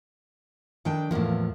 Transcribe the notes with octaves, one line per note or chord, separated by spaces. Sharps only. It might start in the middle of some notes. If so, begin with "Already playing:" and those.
D#3 D4 G5
E2 A2 F3 A#3 B3